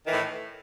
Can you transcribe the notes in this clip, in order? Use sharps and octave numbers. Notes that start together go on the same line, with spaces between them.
A2 D#3 E3